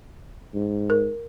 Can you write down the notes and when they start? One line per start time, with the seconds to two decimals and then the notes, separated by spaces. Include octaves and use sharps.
0.54 G#2
0.90 A#4